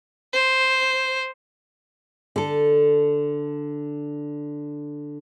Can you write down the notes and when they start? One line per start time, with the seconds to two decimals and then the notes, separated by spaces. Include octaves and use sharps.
0.33 C5
2.36 D3 A4